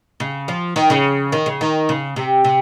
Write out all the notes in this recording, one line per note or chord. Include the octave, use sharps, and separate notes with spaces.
C#3
F3
D#3
C#3
D#3
C#3
D#3
C#3
C3
C3